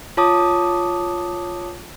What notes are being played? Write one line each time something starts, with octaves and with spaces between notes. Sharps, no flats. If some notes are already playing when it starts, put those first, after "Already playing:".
F4 C#5 A5 D6 D#6